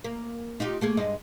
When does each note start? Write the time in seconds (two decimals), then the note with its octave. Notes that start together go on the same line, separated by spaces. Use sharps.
0.04 A#3
0.60 D#4 F4 G4
0.81 A3 A#3 G#4
0.97 G2 G#3 D#5